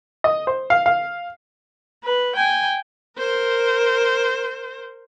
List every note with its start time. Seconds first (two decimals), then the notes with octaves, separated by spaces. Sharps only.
0.24 D#5
0.47 C5
0.70 F5
0.86 F5
2.04 B4
2.36 G5 G#5
3.17 A#4 C5